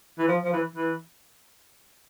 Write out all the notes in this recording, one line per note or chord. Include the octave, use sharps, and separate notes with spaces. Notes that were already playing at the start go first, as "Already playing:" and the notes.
E3
F3
F3
E3
E3